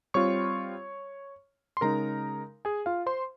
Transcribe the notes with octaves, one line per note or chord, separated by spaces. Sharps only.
G3 C4 F4 C#5 C#6
C6
C#3 G#3 D#4 A#4 A#5
G#4 G#5
F4 F5
C5 C6